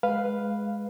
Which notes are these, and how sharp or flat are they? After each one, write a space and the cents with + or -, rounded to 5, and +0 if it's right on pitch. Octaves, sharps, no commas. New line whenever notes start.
G#3 +5 B4 +0 F5 +0